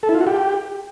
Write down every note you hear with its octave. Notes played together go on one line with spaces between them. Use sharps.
A4
E4
F4
F#4
G4